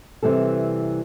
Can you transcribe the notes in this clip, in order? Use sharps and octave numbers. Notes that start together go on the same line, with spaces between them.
C3 E3 G3 A4